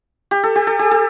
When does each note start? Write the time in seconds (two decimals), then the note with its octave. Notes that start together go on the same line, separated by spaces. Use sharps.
0.31 G4
0.43 A4
0.56 G4
0.67 A4
0.79 G4
0.91 A4